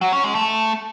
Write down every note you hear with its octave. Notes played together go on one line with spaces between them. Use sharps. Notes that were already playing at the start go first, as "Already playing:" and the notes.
F#3
C#4
G#3
A3